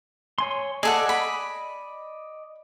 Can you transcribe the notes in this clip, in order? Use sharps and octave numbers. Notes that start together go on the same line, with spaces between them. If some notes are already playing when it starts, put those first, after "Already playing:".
C#5 G#5 C6
G#4 A4 D5 D#5 F#5
B5